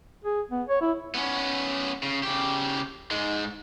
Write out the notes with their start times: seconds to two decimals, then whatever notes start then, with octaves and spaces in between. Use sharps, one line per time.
0.24 G#4
0.51 B3
0.69 C#5
0.81 E4
1.15 B3 C#4
2.03 C#3
2.23 C#3 G4
3.11 G#2 G#3